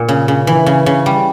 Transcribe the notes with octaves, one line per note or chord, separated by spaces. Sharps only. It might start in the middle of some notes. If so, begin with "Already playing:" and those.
Already playing: A#2
C#3
C#3
E3
C#3
C#3
G3